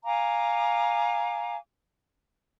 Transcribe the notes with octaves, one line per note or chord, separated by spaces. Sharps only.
F5 G#5 A#5 D6